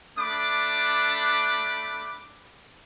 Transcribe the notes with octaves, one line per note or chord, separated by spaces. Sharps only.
A3 D4 B5 D6